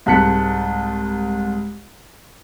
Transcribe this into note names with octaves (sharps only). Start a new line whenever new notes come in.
C2 G#2 A5 F#6 B6 C#7